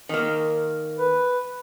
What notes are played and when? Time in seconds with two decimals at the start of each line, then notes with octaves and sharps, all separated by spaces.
0.09 D#3 A#3
0.99 B4